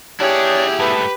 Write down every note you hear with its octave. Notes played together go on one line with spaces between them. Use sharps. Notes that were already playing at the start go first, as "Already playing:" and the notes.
D4 E4 G4 G#4 C#5
G2 A3 B4